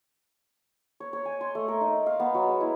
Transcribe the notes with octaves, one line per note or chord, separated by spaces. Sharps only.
C#5
C#5
G#5
C6
A3
A#4
D#4
F5
B3
F#3
G#3
E4